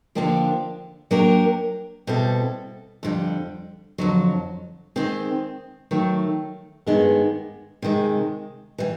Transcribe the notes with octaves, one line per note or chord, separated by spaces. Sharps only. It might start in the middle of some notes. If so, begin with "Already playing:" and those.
D3 F3 A#3 D4 G4
F#3 A#3 D4 G4 A#4
B2 G3 C4 E4 A4
F2 D3 G3
F2 D3 F#3
D#3 G#3 C4
D#3 F#3 A3
G2 D#3 G#3 B3
C3 D#3 G#3
E3 G3